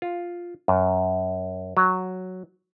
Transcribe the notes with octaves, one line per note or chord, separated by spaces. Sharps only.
F4
F#2
F#3